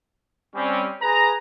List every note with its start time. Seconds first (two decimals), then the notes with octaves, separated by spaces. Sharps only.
0.55 G3 C4 C#4
1.02 G#4 B4 G#5 A#5